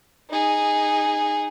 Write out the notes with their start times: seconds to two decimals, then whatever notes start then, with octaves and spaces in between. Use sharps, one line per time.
0.30 D#4 G#4